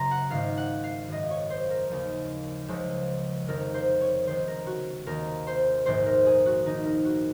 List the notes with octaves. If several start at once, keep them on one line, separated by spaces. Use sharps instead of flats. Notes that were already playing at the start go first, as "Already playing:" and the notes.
Already playing: F#1 C#3 A#5 C6
F#5
G#1 G#2 D#3 F5
F#5
F5
G#1 F#2 D#3 D#5
C#5
C5
A#4
D#2 C#3 F3
C#2 C#3 F3
F1 F2 D#3 A#4
C5
C#5
C#2 C3 D#3 C5
A#4
F#4
D#2 D#3 A#4
C5
A#1 G#2 D#3 C5
A#4
G#4
F#4
D#2 D#3 D#4
A#4
F#4